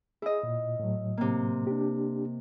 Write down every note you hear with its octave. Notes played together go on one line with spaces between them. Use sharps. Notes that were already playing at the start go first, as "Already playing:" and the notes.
E4 G#4 D#5
A#2
A2 F#3
C3 A#3
D4 G4